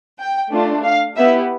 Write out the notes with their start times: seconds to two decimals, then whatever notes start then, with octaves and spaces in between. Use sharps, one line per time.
0.19 G5
0.52 A3 D4 F4
0.84 F5
1.16 B3 E4 G4 E5